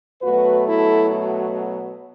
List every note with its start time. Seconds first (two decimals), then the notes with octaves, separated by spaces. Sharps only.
0.22 B2 F#3 A3 F#4 B4
0.67 E4 A4